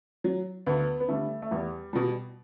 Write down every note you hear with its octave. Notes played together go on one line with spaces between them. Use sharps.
F#3
D2 B3
B3
D3 G3 A3
A3
E2 G3
B2 G3